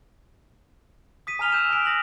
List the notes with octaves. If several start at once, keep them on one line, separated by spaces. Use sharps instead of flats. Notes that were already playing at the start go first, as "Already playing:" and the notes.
D#6 B6 D#7
G#5 A#5 F6 F7 G7
E6 G6 E7
G#5 D#6 F#6 B6 D7
D#6 A#6 F#7